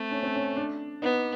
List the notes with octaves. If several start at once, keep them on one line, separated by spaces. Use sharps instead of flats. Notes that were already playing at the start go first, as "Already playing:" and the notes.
Already playing: A3 C4
C#4
C4
C#4
D4
B3 D#4